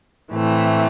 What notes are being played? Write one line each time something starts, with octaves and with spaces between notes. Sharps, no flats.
A2 E3 A3 C4